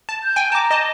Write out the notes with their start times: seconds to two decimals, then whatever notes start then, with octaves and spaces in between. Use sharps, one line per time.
0.09 A5
0.24 G6
0.36 G5 G#5
0.52 A5 A#5 D6
0.71 D#5 A5